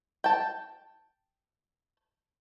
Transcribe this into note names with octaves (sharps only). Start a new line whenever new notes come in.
G5 A5